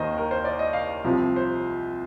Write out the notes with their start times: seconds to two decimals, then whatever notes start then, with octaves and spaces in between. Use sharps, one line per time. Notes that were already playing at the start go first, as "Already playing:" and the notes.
Already playing: D#2 D#3 C5 D#5
0.18 A#4
0.31 C5
0.45 D5
0.59 D#5
0.73 F5
1.04 C2 C3 F3
1.36 C5